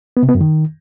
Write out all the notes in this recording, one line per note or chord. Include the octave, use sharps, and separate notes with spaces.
B3
C3
B3
F#2
D#3